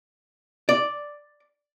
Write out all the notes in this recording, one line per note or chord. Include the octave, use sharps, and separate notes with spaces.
D5